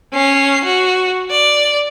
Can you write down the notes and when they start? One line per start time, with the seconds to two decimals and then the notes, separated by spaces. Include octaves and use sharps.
0.13 C#4 C7
0.64 F#4
1.30 D5